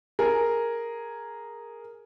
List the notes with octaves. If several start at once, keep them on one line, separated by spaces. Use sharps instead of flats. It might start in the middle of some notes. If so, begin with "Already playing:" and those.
G#4 A#4